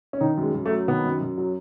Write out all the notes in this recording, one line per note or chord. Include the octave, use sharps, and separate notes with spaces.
C#4
D#3 D#4
F#2
G#3
F#2
A3
F#3
D#3 B3
F#2
F#2
F#3